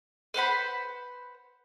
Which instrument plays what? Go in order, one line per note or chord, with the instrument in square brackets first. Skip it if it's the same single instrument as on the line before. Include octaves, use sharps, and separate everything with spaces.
[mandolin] B4 C5 F#5 B5